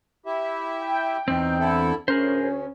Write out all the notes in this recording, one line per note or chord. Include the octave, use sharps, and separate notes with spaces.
E4 G4 E5
G5
E2 C4 D#4
D3 E4 A4
D2 C#4 G#4 A#4 C5